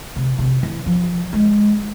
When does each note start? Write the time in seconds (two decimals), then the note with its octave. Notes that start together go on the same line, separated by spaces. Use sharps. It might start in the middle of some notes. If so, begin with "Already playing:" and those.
0.16 C3
0.38 C3
0.63 E3
0.86 F3
1.33 G#3